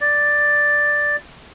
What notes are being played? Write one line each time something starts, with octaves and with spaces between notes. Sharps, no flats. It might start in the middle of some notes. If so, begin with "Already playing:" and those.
D5